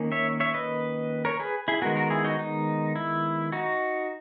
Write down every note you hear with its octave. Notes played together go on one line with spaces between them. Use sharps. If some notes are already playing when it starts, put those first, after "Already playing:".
Already playing: D#3 A#3 C#4
C#5 E5
C#5 E5
B4 D#5
A#4 C#5
G#4 B4
E4 G#4
D#3 G#3 B3 F#4 A#4
F#4 A#4
E4 G#4
D#4 F#4
D#4
E4
D#4 F#4